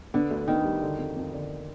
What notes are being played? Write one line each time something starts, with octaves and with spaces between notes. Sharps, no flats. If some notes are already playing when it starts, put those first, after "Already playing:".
D3 B3
D2
D#3 B3
G3
D3
F2
F2
D3